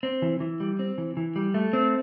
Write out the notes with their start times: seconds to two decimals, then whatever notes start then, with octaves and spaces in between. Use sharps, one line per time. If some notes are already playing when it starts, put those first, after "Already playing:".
0.03 C4
0.22 E3
0.40 E3
0.60 G3
0.79 C4
0.98 E3
1.17 E3
1.36 G3
1.54 A3
1.73 C4